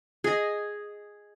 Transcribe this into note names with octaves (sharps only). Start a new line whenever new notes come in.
G#4 D#5